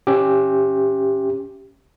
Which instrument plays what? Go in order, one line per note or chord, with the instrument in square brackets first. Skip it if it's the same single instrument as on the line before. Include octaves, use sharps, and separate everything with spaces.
[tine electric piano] C#4 G4